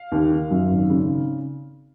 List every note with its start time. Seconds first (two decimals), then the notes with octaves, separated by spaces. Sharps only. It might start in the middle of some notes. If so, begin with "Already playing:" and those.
Already playing: F5
0.12 D#2
0.31 D#3
0.51 F#2
0.71 G#1
0.90 C#3